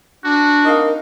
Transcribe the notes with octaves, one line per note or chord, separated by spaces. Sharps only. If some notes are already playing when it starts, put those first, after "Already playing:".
D4 F#4
D#4 A#4 D#5 F5